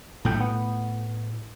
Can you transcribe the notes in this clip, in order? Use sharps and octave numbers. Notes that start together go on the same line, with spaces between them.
B1 A2 A3 G5
B3